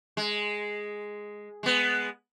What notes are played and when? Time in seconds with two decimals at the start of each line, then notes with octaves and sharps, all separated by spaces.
0.17 G#3
1.63 G#3 B3